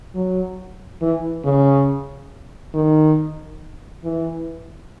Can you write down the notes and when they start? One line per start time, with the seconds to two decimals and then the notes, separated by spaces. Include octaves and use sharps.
0.15 F#3
1.02 E3
1.44 C#3
2.74 D#3
4.04 E3